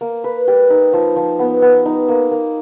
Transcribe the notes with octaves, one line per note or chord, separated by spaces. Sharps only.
A#3
B4
G4
D#4
F3
F3
B3
B3
D#4
A#3
A#3